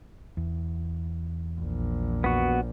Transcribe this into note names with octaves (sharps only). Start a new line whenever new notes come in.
E2
A#1
B3 F#4